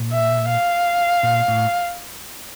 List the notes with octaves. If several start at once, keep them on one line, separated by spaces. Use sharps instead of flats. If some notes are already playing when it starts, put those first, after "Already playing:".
Already playing: A#2
E5
F5
A#2
A2